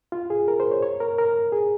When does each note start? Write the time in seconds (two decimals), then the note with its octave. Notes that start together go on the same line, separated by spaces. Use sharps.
0.12 F4
0.30 G#4
0.48 A#4
0.60 C5
0.71 C#5
0.83 C#5
1.00 A#4
1.18 A#4
1.52 G#4